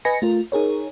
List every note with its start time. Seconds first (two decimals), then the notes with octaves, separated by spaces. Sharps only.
0.05 B4 D#5 G#5 B5 A#6 C#7
0.22 A3 F4 A#4
0.52 D#4 G#4 A#4 C#5